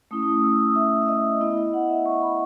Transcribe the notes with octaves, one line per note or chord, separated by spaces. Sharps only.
A3 C#4 E4 D#6
D#6
E6
D#6
E5
E5
D#5
B3 E4 D#5
D#5
F#5
E5
C#6
B5